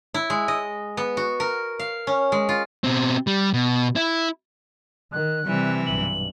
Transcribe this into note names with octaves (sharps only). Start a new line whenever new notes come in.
E4
G#3
D#5
B3
F#4
A#4
F5
C#4
G#3
F4
B2 C4
G3
B2
E4
D#3 F#6
C3 E3 G3
B1 G2 F#7